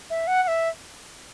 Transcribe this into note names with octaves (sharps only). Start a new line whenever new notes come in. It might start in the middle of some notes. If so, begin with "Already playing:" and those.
E5
F#5
F#5
E5